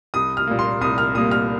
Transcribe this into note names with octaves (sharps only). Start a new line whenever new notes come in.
C2 D#6
F6
A#2 G3 A#3
C6
C2 D#6
F6
A#2 G3 A#3 D#6
F6